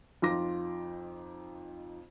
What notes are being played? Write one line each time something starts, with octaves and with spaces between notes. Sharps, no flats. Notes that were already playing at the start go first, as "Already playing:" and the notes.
F2 D#4 F4 D6 A#6